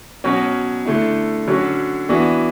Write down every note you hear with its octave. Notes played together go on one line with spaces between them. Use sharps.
B2 F#3 C#4 F#4
D3 A3 E4
D3 F#3 C#4 F#4
E3 B3 D4 F#4